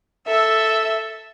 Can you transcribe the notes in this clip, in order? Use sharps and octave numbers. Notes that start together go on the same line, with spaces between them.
A4 E5